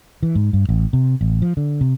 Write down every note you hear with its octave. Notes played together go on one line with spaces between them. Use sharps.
E3
G#2
G2
A1
C3
A1
F3
D3
C3